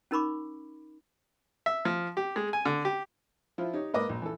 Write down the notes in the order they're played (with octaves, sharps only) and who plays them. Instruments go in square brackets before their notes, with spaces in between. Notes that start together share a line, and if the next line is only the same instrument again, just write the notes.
[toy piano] C#4 D#4 A#4 B5 C#6 D6
[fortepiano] E5
F3
G4
G#3
G#5
D3
G4
F3 E4 F4
D#4 G4 C#5
G#2 A#3 A#4 B4 D#5 D6
A#1
E3 A4